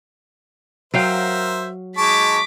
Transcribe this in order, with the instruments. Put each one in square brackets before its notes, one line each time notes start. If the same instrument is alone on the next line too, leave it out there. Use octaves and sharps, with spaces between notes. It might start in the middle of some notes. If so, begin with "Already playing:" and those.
[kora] F#3 F5 G5 [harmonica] A#4 C5 E5
[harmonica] G#3 D#4 A5 [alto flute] C#6 [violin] D6 B6